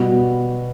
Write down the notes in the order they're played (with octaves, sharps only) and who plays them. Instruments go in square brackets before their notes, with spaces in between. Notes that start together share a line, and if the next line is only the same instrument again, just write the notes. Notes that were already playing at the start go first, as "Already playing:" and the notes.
Already playing: [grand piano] B2 G3 B3 F#4